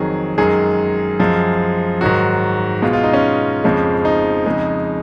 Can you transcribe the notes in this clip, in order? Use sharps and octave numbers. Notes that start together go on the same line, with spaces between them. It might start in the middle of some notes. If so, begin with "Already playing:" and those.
Already playing: F2 D#3 F#3 G#4
F#2 D#3 G#3 G#4
F#2 F3 G#3
G#2 D#3 F#3 F#4
B2 G#3 F4
F4
D#4
C#4
F2 C#3 F3 G#3
D#4
F2 C#3 G#3